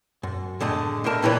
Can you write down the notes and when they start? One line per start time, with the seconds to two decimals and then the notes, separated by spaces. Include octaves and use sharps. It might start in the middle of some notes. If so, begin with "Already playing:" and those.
0.23 F#2
0.60 A2 D3 G#3 A3
1.04 A2 A3 D4 A#4 A5
1.22 B1 A#2 E3 G3 B4 C#5